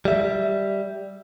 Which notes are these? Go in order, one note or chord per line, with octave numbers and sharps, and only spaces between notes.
G3 E5